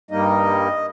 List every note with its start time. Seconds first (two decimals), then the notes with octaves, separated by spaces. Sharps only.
0.11 G2 G3 A#3 D#4 D#5